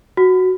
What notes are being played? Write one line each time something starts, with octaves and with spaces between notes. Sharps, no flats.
F#4